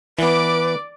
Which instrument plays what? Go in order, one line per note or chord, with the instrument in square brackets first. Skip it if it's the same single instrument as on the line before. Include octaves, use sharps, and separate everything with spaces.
[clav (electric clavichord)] E3 B3 [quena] B4 [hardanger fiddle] D5 D6